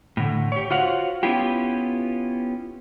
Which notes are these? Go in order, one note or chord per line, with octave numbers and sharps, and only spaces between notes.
A2 D3
G4 C#5
F4 F#4 C5 C#5 F5 F#5
B3 C#4 E4 F4 G4